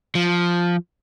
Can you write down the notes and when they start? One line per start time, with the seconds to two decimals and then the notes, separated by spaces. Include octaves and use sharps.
0.15 F3